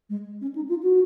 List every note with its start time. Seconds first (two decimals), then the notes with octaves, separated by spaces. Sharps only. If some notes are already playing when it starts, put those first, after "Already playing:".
0.10 G#3
0.41 C#4
0.55 D#4
0.69 F4
0.83 F#4